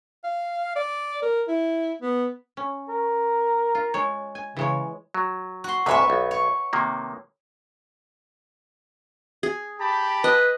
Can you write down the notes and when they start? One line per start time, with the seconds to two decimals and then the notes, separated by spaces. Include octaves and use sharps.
0.24 F5
0.76 D5
1.22 A#4
1.48 E4
2.02 B3
2.57 C#4
2.89 A#4
3.75 F4
3.94 G#3 C#5
4.35 G#5
4.57 C#3 E3 G#3 C#5
5.14 F#3
5.64 F#4 C6
5.86 D2 G#2 C3 B4 C#5 E5
6.10 B1
6.31 C#5
6.73 C3 D#3 A#3
9.43 G#4
9.80 G4 A5 B5
10.24 B4 D#5